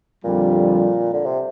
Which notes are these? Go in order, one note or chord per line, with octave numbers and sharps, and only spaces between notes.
F2 A#2 D3 G3
D3
C3